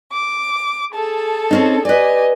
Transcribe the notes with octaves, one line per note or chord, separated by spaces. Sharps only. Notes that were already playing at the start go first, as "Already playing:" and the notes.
D6
G#4 A4 A5
C4 C#4 D#4
G4 B4 D5 D#5 G#5